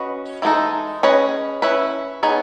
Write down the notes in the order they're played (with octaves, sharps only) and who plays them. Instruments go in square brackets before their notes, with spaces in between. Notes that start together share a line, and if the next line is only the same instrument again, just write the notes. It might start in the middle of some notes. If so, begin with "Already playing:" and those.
Already playing: [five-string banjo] C#4 F#4 B4 D#5
E3 G#3 B3 D#4 A4
C#4 G#4 B4 D#5
C#4 E4 B4
B3 D#4 G#4 C#5